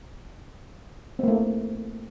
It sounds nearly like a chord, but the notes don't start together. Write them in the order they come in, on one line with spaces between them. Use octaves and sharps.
C4 A#3 A3